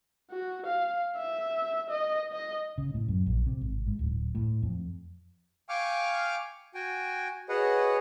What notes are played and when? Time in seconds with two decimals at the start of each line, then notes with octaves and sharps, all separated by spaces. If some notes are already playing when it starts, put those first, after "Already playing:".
0.31 F#4
0.66 F5
1.17 E5
1.90 D#5
2.32 D#5
2.78 C#3
2.94 A2
3.08 F#2
3.26 A#1
3.46 C3
3.61 G#1
3.87 G#2
3.99 D1
4.35 A2
4.63 F2
5.69 F5 G5 G#5 C#6 D6 F6
6.74 F#4 G5 G#5
7.49 F#4 G#4 B4 C#5 D#5 F#5